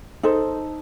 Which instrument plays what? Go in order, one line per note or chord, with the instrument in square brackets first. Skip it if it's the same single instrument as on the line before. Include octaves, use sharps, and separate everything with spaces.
[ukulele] D#4 A4 C5